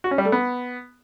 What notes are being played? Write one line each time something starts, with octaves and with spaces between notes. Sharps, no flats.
F#4
C#4
G3
A3
B3